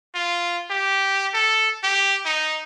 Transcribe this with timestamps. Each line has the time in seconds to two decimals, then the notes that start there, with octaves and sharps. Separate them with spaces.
0.15 F4
0.71 G4
1.34 A4
1.83 G4
2.25 D#4